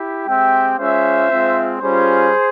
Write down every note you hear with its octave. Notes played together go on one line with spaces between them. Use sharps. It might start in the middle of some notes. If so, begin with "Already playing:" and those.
Already playing: E4 G4
G#3 C4 G4 E5 G5
G#3 C#4 F4 C5 E5
G#3 C4 F4
G3 C#4 F4 G#4 C5